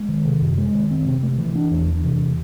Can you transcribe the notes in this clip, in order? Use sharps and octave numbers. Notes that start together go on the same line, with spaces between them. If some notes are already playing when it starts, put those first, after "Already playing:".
Already playing: G#3
D#3
C3
F#2
G#3
D#3
C4
C3
A3
E3
D4
E2
E3
C3